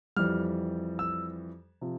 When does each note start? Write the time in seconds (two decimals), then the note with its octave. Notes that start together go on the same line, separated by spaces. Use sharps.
0.16 F2 E3 G3 F6
0.99 E6
1.81 C3 F3